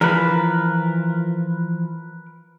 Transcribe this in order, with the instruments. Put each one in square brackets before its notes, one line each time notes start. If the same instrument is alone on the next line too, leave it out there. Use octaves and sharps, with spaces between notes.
[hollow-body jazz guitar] E3 F3 [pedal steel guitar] A#4 B4